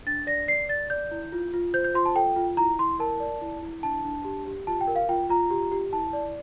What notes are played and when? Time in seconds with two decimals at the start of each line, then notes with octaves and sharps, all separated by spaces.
0.06 D4 A6
0.27 D5 A#6
0.48 D5 C7
0.69 D5 A6
0.90 D5 G6
1.11 E4
1.32 F4
1.54 F4
1.74 C5 G6
1.84 G6
1.94 F4 C6
2.06 A5
2.15 A4 G5
2.36 F4
2.57 E4 A#5
2.79 E4 C6
3.00 A#4 A5
3.20 D5
3.42 E4
3.63 E4
3.83 D4 A5
4.04 D4
4.25 G4
4.47 G4
4.67 F4 A5
4.81 G5
4.87 A#4
4.96 F5
5.09 F4 G5
5.29 F4 A#5
5.51 G4
5.71 G4
5.93 E4 A5
6.13 D5